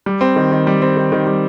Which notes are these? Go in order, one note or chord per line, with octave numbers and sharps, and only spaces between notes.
G3
C4
D#3
D#3
G3
C4
D#3
D#3
G3